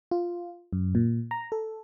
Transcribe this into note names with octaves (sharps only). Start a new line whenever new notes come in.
F4
F#2
A#2
A#5
A4